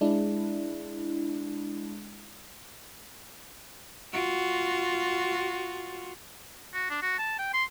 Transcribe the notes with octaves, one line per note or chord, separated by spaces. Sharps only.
G#3 D4 E4
F4 F#4
F#4
D4
F#4
A5
G5
C6